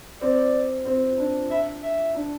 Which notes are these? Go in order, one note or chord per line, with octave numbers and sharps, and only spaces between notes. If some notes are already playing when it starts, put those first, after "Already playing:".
C4 D5
C4
D4
E5
E5
D4